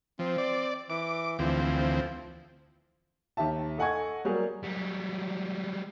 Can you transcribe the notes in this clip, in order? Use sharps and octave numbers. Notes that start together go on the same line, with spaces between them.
F3 C4
D5
E3 D6
D2 E3 F3 C4
D#2 G4 E5 A5
A4 D#5 F#5 G#5 C#6 G#6
F#3 G3 A#3 F#4 G#4
F#3 G3